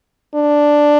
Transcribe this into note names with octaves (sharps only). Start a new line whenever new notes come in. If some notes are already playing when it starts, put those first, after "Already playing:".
D4